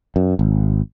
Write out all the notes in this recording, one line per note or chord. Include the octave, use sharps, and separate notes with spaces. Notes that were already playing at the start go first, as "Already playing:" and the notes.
F#2
G#1